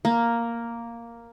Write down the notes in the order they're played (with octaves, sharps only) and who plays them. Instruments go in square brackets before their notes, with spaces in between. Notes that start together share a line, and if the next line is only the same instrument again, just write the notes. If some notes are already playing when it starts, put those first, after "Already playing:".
[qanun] A#3